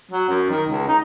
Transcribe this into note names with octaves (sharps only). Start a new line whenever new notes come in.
F#3
F#2
D#3
C#2
D#4